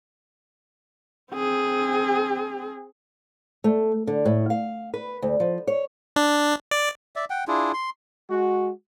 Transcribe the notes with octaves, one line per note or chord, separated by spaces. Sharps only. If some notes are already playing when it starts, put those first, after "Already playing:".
C4 G#4
A3
D3
A2
F5
B4
D2
F3
C#5
D4
D5
D5 E5
F#5 G5
D4 E4 F4 G#4
C6
G#3 F#4